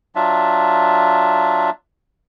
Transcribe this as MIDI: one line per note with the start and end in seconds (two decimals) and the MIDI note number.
0.15 1.70 54
0.15 1.70 62
0.15 1.70 65
0.15 1.70 76